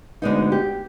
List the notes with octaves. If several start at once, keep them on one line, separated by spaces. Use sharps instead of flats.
D2 D3 G#3 B3 D#4
G4